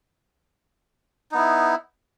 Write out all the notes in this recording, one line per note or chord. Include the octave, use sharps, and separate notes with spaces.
B3 D#4 E4